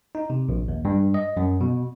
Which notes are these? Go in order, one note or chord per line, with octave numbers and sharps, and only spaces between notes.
D#4
C3
A#1
D#2
G2
D#5
F#2
B2